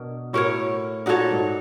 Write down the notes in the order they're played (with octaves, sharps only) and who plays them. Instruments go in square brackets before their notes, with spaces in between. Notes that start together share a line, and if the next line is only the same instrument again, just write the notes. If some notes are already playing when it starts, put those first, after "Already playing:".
Already playing: [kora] B2 [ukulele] D4 A#4
[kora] A2 [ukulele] F#4 A#4 C#5
[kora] A#2 [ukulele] D#4 F#4 A4 C#5
[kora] G#2